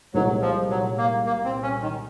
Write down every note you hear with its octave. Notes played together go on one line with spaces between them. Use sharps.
C2 A#2 F#3 G#3 D#4 A#4
F3
F#3
A#3
A#3
C4
C#4
D#3